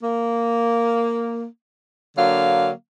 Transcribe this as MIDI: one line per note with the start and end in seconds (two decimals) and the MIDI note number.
0.01 1.44 58
2.16 2.70 50
2.16 2.70 54
2.16 2.70 58
2.16 2.70 77